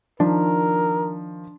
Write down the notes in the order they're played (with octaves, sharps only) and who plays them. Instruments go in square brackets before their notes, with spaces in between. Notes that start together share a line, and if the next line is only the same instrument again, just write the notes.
[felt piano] D#3 F3 [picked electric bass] D4 [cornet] A#4